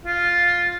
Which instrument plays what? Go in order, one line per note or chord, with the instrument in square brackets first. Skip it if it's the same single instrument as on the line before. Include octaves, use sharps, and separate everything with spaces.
[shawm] F4